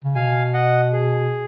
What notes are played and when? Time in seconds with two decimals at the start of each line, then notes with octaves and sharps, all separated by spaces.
0.04 C#3
0.15 B2 F5 G#5
0.54 D#5 F#5
0.93 G#4